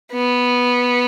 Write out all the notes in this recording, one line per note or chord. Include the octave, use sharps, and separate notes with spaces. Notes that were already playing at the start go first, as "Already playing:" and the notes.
B3